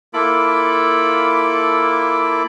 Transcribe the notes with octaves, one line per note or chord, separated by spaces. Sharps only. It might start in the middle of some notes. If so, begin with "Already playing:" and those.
A#3 E4 F4 A4 B5 D6